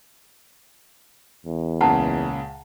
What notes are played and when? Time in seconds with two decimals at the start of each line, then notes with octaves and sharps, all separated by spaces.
1.46 E2
1.81 C#2 A#2 C#3 F#5 A5 A#5